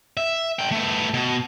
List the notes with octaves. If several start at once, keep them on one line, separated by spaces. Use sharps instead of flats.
E5
D3 G5
A3 B3
B2